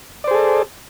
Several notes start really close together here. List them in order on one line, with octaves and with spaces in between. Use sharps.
D5 C5 G#4 A4